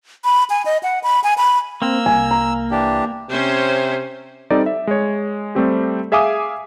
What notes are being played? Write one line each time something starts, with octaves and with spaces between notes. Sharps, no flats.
B5
G#5
D#5
F#5
B5
G#5
B5
A#3 C4 E6
C2 G#5
A#5
E3 D4 G4
C3 C#4 C5
G3 C4 D#4 A4 D5
E5
G#3 C#5
G3 A3 C4 G4
G#4 E5 F5 G#5 D6 D#6